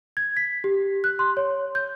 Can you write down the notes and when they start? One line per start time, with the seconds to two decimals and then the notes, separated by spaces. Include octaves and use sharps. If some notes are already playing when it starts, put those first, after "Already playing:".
0.17 G#6
0.37 B6
0.64 G4
1.04 F#6
1.19 C6
1.37 C#5
1.75 G6